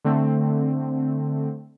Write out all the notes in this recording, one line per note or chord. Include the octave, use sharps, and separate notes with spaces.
D3 A3 C4